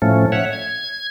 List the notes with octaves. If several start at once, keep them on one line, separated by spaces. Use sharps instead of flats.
A2 F3 A3 C#4
C#5 E5 F#5
G#6